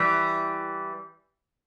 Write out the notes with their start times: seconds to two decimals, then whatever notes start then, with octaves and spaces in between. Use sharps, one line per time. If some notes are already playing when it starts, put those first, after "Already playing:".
Already playing: E3 G3